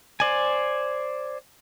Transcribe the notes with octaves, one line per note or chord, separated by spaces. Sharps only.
C5 D5 G#5